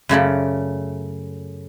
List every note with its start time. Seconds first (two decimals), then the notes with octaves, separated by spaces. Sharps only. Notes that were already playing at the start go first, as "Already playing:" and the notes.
0.09 F#2 C#3 A3 D5